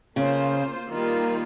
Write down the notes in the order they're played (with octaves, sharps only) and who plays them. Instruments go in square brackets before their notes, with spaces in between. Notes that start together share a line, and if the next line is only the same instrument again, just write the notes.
[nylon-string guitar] C#3 [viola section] A#3 F4 C5
[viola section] D#3 G3 A#3 F4